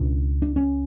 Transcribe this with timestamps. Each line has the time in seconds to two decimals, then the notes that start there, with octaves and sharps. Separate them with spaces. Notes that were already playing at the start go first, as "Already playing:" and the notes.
Already playing: C#2 B2 D4
0.42 D4
0.56 C#4